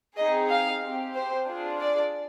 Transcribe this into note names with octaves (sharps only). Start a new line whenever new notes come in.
C4 D#4 G#4 D#5
F5
C4 G4
C5
D4 F4 G#4
D5